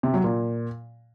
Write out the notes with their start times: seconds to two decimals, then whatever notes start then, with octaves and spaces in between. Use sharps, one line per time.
0.03 C3
0.14 F#3
0.24 A#2